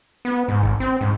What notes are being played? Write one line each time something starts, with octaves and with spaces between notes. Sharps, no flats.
B3
G#2
G#1
C4
G#2